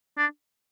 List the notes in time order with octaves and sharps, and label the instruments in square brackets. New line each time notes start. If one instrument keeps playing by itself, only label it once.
[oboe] D4